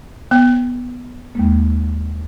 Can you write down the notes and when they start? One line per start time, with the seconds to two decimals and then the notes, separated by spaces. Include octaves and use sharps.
0.31 B3
1.35 D#2 G#3 A#3